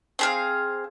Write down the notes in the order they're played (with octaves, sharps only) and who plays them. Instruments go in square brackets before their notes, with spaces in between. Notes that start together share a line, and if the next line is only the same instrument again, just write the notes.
[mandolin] C4 G#4 F5